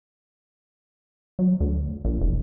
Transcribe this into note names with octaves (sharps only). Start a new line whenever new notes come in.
F#3
D2
A#1
E1